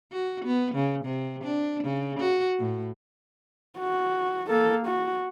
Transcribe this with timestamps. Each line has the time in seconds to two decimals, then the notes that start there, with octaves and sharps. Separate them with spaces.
0.12 F#4
0.45 B3
0.75 C#3
1.05 C3
1.44 D4
1.83 C#3
2.20 F#4
2.59 A2
3.78 F#4
4.49 A#3 A4
4.86 F#4